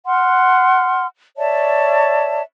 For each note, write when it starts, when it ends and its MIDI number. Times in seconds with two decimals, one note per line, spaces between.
0.06 1.06 78
0.06 1.06 84
0.06 1.06 89
1.37 2.41 73
1.37 2.41 74
1.37 2.41 76
1.37 2.41 81